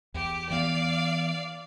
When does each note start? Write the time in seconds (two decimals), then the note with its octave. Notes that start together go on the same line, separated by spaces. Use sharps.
0.14 E2 G4
0.50 E3 B3 D5 F5